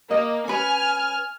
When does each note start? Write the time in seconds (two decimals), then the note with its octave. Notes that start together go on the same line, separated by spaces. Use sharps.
0.11 A#3 D#5
0.48 C#4 B4 G#5 F6